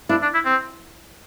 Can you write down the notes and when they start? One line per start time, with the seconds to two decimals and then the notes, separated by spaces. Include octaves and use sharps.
0.09 D4 E4
0.22 D4
0.34 E4
0.45 C4